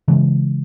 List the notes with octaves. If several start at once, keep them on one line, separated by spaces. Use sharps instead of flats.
C#3 E3 G#3